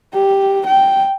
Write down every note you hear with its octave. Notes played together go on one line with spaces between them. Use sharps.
G4
G5